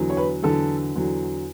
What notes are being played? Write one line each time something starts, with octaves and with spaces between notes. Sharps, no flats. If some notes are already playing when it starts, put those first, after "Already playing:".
Already playing: E2 D3 F#3
C#5
B4
E2 D3 F#3 A4
E2 D3 F#3